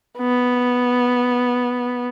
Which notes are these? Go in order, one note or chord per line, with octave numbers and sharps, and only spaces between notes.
B3